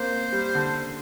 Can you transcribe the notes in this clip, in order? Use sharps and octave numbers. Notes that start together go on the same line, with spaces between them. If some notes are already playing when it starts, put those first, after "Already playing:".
Already playing: A#3 C4 C5
G3
D3